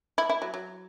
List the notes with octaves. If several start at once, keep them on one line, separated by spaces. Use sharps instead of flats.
E4
E4
F#3
F#3